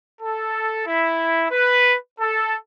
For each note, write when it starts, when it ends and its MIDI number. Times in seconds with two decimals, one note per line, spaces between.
0.21 0.86 69
0.87 1.46 64
1.51 1.95 71
2.20 2.54 69